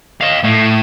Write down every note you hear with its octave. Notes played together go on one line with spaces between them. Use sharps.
D#5 F5
A2